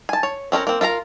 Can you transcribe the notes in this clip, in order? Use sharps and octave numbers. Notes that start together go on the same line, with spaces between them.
G#5 A5
C#5
C4 C#4 D#4 A#4
A#3 C4
F4 A#4 E5 A#5